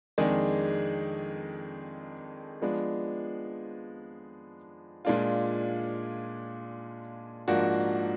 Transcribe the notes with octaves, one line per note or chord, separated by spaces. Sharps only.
F2 D#3 G#3 D4 G#4
F3 G#3 B3 D4
A#2 G#3 D4 F4
G#2 F3 A#3 D4 F#4